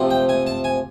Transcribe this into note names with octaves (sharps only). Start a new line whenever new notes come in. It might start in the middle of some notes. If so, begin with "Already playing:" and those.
Already playing: C3 F3 A3 C4
G5
G#5
A5
G#5